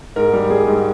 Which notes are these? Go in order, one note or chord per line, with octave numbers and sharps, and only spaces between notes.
G#2 A#4
G3
G3 G#4
G#2